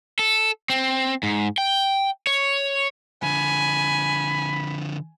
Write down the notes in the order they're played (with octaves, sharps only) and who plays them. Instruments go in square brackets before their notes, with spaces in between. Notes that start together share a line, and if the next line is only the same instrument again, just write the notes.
[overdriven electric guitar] A4
C4
G#2
G5
C#5
[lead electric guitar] D3 F3 [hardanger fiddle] G#5 [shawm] B5